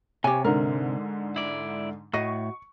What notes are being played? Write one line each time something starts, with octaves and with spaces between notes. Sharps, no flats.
C3 G4 C#5 G#5
G#2 D3 A#4
E4 D5
A2 F#4 D#5 C#6